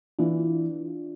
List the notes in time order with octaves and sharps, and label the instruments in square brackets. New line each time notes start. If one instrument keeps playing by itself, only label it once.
[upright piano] E3 [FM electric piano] D4 F4